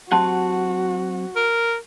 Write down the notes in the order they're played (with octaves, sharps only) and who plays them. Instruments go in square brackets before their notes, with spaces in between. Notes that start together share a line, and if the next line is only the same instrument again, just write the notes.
[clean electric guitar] F#3 C4 F#5 [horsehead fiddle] F#4 [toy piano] G4 A5 C6
[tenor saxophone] A#4